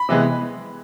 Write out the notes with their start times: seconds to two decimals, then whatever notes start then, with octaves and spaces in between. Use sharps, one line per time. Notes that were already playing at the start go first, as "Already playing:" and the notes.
Already playing: B5
0.09 C3 E3 G#3 B3